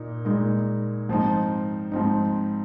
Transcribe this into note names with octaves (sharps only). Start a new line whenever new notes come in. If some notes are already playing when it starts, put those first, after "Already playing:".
Already playing: A#2 D#4
A#2 G#3 D#4
G#2 F3 C4 D#4
G#2 F3 C4 D#4